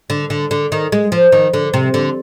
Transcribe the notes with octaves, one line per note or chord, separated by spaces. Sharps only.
D3
D3
D3
D#3
G#3
F3
D#3
D3
C3
D3